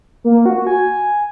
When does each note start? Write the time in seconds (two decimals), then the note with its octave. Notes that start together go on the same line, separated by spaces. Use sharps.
0.24 A#3
0.46 F#4
0.67 G#5